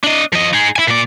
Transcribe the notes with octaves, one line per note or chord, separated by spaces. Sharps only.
D4 D#5
F3 D#5
D#4 G#4
E4 G#5
A#2 D5